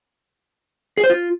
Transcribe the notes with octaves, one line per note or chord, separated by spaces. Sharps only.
G#4
C5
F4